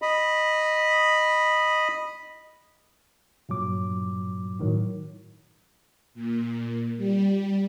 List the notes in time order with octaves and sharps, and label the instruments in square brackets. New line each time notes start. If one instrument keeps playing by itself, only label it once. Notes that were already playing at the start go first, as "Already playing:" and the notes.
[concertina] D#5 B5
[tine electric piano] G2 A#2 F#3 D6
A2 D#3 F#3
[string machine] A#2
G3